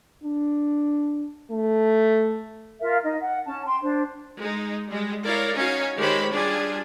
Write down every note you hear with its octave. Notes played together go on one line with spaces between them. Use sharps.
D4
A3
F4 A#4 E5 F5
D#4 D#5
F#5
C#4 A5
G5 C6
D4 C5
G#3 D#4
G3 G#3
E4 A#4 C#5 D5 F5
C#4 D#4 F#4 C#5 F5 G#5
D#3 G#3 G4 C5 C#5 B5
G3 D4 F4 G#4 G#5